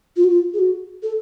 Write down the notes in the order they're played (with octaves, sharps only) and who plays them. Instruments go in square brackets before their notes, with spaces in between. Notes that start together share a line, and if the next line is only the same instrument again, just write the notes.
[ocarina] F4
F#4
F4
G#4
F#4
A4